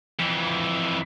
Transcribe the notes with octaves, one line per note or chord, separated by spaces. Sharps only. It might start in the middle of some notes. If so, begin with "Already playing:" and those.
F2 E3